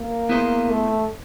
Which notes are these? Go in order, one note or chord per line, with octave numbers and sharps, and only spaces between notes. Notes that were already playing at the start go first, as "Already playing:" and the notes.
Already playing: A#3
B3 E4 G#4 C5
A3